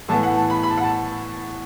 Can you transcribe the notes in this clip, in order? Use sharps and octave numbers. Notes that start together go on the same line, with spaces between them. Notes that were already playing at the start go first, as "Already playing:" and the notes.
A2 E3 B3 A5
F#5
A5
B5
B5
A5
F#5
A5